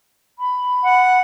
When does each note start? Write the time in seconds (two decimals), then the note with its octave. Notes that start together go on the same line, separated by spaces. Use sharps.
0.38 B5
0.83 F#5